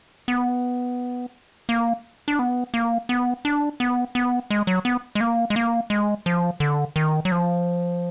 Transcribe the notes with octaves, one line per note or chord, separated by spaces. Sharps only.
B3
A#3
D4
B3
A#3
B3
D4
B3
B3
G#3
F#3
B3
G#3
A#3
G#3
A#3
G#3
F3
D3
D#3
F#3
F3